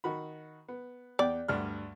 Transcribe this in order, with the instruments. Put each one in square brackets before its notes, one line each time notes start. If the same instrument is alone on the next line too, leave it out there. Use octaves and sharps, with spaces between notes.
[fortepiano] D#3 F#4 B5
B3
[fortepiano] E2 G5 [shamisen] D5
[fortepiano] D2 G2 F6